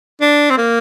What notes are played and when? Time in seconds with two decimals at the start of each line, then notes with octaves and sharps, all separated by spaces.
0.21 D4
0.50 C4
0.58 A#3